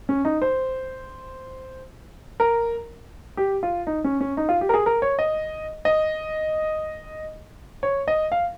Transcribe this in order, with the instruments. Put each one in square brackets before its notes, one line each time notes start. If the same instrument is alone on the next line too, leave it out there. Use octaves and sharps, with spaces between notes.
[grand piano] C#4
D#4
C5
A#4
G4
F4
D#4
C#4
C#4
D#4
F4
G4
A#4
G#4
A#4
C#5
D#5
D#5
C#5
D#5
F5